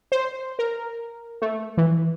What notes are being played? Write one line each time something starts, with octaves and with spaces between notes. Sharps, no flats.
C5
A#4
A3
E3